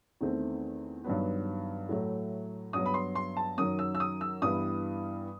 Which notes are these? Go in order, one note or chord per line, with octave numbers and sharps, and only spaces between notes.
E2 D#3 A3 C4
G2 D#3 F#3 B3
A2 F#3 A3
G2 F#3 B3 D#6
B5
C6
C6
A5
F#2 D#3 F#3 D#6
E6
E6
D#6
E6
G2 E3 G3 B3 D#6